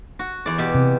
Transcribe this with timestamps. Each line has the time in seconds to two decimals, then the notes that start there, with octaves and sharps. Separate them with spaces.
0.19 F#4
0.46 E2 D5
0.58 B2 G4
0.74 C3